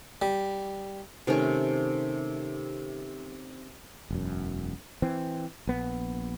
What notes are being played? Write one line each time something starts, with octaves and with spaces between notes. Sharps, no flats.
G3
C3 D#3 A3 C#4
E1 F#2
E3 C4
A#1 B3